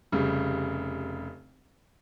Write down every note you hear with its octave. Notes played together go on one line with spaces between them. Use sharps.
F1 C#3 G3